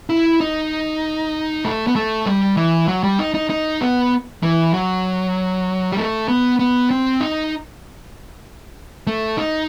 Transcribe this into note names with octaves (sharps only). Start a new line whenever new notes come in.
E4
D#4
A3
B3
A3
G3
E3
F#3
G3
D#4
D#4
D#4
B3
E3
F#3
G3
A3
B3
B3
C4
D#4
A3
D#4